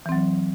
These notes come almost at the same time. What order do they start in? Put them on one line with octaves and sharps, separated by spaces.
E3 C4 F#3